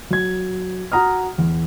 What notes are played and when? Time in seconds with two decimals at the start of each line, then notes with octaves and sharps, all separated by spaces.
0.10 F#3 G#6
0.92 F#4 F#5 A#5 D#6 F6
1.38 E2